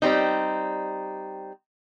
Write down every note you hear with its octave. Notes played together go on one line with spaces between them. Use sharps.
G3 C4 D#4